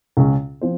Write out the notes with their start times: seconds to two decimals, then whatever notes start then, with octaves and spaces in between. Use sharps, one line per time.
0.17 C#2 C#3 G#3 C#4
0.62 F3 C4 C5